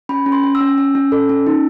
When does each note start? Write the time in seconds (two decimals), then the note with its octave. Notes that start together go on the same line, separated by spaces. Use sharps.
0.09 C#4 B5
0.26 C#4
0.32 C6
0.44 C#4
0.55 E6
0.61 C#4
0.78 C#4
0.95 C#4
1.12 A4
1.29 C#4
1.47 D#4